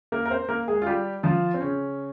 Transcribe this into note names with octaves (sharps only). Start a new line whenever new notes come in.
A#3 A#4
A#4
C4 C5
A#3 A#4
G#3 G#4
F4
G3 G4
F3 F4
C4
C#3 C#4